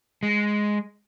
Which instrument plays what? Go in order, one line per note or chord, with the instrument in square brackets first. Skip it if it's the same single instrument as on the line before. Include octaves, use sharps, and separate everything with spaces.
[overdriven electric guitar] G#3